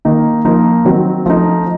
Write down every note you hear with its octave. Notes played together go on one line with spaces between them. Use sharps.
D#3 A#3 D#4
F3 A#3 D#4
D#3 F#3 C4
F3 A3 D#4